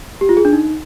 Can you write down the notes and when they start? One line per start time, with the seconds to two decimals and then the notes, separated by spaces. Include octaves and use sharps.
0.21 G4
0.29 F4
0.37 G#4
0.45 D4
0.53 D#4